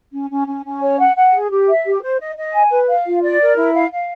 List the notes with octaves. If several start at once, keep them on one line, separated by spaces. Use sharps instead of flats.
C#4
C#4
C#4
C#4
C#5
F#5
F#5
G#4
G4
E5
G4
C5
D#5
D#5
G#5
B4
F5
F4
D5
A#4
E4
F5
F5